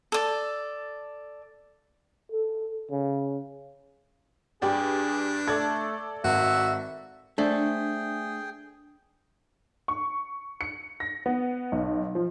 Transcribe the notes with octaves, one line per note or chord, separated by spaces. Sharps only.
A4 D5
A4
C#3
G2 D4 G#4 D5 G5
A3 A4 D5 G#6
G#1 F#4 E5
A3 D4 G#4 A4 C5 D5 G5
C#6
C#7
A#6
B3
B1
F3